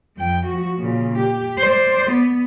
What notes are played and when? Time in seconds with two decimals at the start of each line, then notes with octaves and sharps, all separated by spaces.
0.17 F2 G5
0.46 F3 F#4
0.79 A#2 C#3
1.18 G4
1.59 C5 D5
2.11 B3